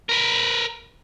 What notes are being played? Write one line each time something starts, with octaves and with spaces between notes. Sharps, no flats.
A#4 B4